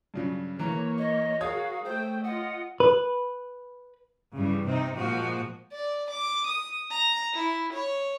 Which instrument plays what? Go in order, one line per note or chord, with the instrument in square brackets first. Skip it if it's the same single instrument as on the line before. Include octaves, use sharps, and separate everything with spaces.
[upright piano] G2 C#3 F#3
[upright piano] E3 [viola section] A#3 C#5 [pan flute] A#5
[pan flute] D#5
[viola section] F#4 G#4 A#4 [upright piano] C#5 D#6 G#6 [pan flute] F5
[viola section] A3 G5 [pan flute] C5
[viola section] F4 D#5 [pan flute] F#5
[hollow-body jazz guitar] B4
[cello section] G2 C#3 E3 G3
C3 C4 D#4
A#2 F3 G#3 A#3 F#4
[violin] D5
D6
D#6
A#5
E4
C#5